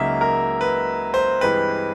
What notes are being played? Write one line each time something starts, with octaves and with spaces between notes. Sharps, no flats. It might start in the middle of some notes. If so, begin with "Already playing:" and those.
Already playing: C#2 C#3 F#3 A#3 D#4 E5
A#4
B4
C5
G2 E3 G#3 C4 B4